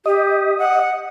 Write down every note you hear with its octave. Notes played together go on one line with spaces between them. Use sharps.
G4 D#5
F#5